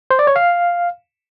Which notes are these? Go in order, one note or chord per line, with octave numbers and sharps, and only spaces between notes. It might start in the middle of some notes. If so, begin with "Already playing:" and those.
C5
D5
C#5
F5